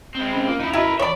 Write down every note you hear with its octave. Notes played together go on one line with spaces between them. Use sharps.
G#3 C4
C#4
A#3 F4
D#2 D#4 E4
E4 F#4 A#4 B4 D#5 A#5
E3 C#5 D5 E5 B5